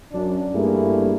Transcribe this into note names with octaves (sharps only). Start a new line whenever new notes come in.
F#2 D4
G2 A3 A#3 E4 G#4